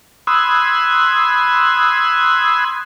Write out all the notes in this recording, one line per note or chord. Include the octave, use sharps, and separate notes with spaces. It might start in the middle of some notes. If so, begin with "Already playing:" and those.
B5 C6 D#6 E6 F#6 G#6